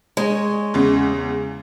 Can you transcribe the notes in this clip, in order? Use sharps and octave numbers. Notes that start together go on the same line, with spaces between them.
G#3 C#5
E2 C#3